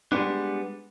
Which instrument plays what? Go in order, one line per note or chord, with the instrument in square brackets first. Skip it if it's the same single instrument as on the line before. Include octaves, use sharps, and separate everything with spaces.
[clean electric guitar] G3 G#3 B3 D4